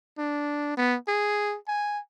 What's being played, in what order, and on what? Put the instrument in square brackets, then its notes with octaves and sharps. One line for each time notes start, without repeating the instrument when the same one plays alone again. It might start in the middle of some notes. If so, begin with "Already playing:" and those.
[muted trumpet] D4
B3
G#4
G#5